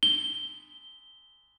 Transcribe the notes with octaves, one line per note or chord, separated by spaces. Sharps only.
G7